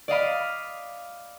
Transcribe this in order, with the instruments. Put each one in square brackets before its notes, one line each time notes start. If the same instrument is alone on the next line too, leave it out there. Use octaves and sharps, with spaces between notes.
[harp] D5 D#5 F5 B5